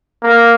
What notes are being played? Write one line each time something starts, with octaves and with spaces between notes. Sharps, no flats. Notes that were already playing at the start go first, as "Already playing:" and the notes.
A#3